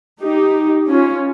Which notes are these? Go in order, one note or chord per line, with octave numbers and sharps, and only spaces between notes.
D#4 G4
C#4 F4